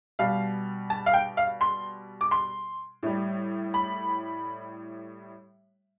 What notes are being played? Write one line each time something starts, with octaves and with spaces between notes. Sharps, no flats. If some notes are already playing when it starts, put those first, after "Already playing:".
B2 G3 F5
A5
F5
G5
F5
C6
D6
C6
A2 G3
B5